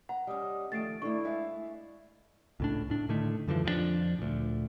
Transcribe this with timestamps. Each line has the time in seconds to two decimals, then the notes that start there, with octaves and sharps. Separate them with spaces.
0.09 F#5 A#5
0.27 G3 C#4 D#5
0.72 D#3 F3 A3 A6 C7 D7
1.02 A3 D4 E4 A4 D5 C#6
1.24 G#3 E5 F5
2.60 C#2 A2 D4
2.90 A2 D4
3.09 A2 D3 D#3 A3
3.48 F#2 D3 E3 F3
3.64 F2 F3 F#3 D4
4.19 D2 A#2